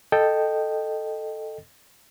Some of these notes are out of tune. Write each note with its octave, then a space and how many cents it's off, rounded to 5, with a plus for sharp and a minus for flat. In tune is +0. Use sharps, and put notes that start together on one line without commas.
A4 +0 D#5 -15 G5 +0